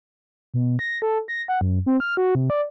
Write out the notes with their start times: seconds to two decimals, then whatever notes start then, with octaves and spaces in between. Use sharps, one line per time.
0.54 B2
0.79 A#6
1.02 A4
1.28 A#6
1.48 F#5
1.61 F#2
1.86 C4
2.00 F6
2.17 F#4
2.35 C3
2.50 D5